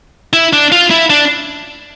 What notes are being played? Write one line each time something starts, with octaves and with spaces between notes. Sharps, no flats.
E4
D4
F4
E4
D4